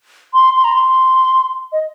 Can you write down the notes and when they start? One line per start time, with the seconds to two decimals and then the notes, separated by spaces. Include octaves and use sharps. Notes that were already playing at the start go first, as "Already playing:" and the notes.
0.34 C6
0.56 C6
0.64 A#5
0.73 C6
1.72 D#5